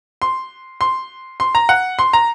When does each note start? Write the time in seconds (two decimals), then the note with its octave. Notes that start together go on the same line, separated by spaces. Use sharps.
0.22 C6
0.81 C6
1.40 C6
1.55 A#5
1.69 F#5
1.99 C6
2.13 A#5